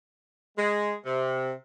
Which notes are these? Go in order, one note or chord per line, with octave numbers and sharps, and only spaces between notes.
G#3
C3